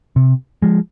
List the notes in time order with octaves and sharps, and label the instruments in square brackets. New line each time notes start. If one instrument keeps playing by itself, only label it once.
[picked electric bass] C3
F3 G#3